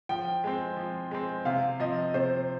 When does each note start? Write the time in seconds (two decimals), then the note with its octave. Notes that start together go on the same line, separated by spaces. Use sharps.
0.09 F3 G5
0.44 G#3 C4
0.77 F3
1.11 G#3 C4
1.45 C3 F5
1.80 F3 C4 D#5
2.14 C3 C5